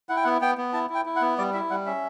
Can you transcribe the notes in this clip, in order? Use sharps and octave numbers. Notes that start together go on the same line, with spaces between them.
E4 F#5
G5
B3 F#5
B3 G5
B3
E4 A5
E4
G5
E4
F#5
B3
G3 D5
E4 E5
G3 F#5
C#4 E5